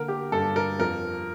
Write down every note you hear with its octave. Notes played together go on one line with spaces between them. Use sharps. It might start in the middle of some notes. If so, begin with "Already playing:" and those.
Already playing: D3 A#3 A#4
G4
G2 A4
A#4
F2 A#4